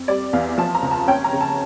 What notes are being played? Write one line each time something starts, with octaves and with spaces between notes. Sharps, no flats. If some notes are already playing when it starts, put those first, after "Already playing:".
Already playing: F2
G3 D5
E2 F5
F3 A5
A#5
C#2
A5
C#4 G5
A#5
C#3
A5